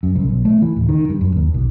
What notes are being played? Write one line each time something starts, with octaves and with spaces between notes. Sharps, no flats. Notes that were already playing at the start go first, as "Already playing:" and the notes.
F#2
C2
B1
A3
E3
D1
D#3
G2
F#2
D#2
B1